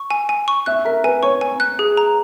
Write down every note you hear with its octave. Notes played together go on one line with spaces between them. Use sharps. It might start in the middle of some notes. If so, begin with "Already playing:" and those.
Already playing: C#6
G#5
G#5
C#6
E5 F#6
A#4 E5
B4 G#5
C#5 C#6
G#5
F#6
G#4
A#5